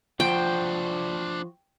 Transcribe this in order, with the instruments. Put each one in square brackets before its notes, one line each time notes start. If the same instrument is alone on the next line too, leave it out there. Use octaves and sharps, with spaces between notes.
[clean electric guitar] F3 F#4 [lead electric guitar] D4 C5 [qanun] G5